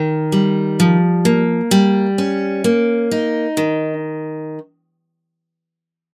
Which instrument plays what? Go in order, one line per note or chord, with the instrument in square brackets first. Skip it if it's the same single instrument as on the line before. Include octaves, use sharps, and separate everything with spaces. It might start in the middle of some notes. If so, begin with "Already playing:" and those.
Already playing: [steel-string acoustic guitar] D#3
G3
F3
A#3
G3
C#4
A#3
D#4
D#3